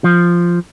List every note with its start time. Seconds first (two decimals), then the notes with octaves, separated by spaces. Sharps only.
0.04 F3